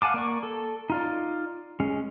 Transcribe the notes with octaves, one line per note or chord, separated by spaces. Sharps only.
F5 F#5 G#5 A5 D6
A#3 D5 C#6
A4
D#4 F4 D5
G#3 C#4